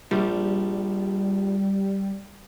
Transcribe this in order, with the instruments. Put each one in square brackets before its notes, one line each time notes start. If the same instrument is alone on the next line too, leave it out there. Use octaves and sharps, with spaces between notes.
[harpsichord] A#1 [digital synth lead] G3